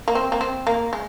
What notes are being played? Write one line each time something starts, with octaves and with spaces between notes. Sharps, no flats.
A#3
C4
A#3
C4
A#3
G#3